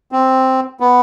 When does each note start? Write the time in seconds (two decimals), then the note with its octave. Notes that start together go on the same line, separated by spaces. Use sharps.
0.12 C4
0.80 B3